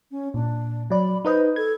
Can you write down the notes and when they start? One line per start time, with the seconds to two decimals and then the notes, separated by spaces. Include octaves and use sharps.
0.11 C#4
0.34 A#2 D4
0.90 F#3 D5 B5
1.25 D#4 B4 C5 D#5
1.56 A4 G#6